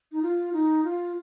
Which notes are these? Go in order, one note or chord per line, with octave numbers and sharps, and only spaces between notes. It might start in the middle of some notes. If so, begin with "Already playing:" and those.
D#4
F4
D#4
F4